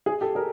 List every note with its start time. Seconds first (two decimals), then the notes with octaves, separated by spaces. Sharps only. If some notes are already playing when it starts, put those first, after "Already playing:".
0.06 G#4
0.21 G4 A4
0.35 G#4 A#4